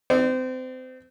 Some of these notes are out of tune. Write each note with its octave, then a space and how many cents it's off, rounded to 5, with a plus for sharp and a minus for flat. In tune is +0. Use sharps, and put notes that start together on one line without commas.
C4 -30 D5 +35